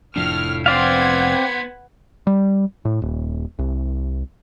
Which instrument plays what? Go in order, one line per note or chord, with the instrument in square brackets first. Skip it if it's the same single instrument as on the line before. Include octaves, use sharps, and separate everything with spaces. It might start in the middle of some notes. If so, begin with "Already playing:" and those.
[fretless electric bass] F1 F3 D4 [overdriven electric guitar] A2 [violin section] F6
[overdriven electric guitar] B3 C5 [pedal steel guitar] C4 D5 F5 [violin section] B4 F#5 G#6
[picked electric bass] G3
A2
D#1
C2